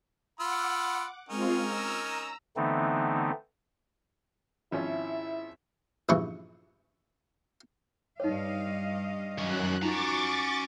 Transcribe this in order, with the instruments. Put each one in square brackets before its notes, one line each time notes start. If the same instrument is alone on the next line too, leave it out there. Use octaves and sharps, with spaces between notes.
[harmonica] F4 B5 E6 [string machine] F#5 D6
[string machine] G#3 C4 F4 [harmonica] C#4 D#4 A#4
[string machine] A#5 E6
[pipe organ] D3 E3 A3 B3 C4 D#4
[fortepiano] G#1 F3 C#4 [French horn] E4 [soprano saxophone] E5
[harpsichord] A#1 G2 C#3 E3 B4 C#6
[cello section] G2 D#5 F5 [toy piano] D#4 C#5
[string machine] F#2 F#6 [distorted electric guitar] D#3 C#4
[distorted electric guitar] C#4 A#5 [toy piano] D#4 F4 [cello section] F#4 [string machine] C#6 D6 A6